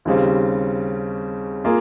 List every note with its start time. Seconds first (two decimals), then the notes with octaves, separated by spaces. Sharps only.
0.05 D#2 C#3 G3 C4
1.64 A#3 F4 G#4